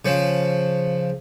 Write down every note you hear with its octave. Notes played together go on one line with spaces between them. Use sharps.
C#3 F3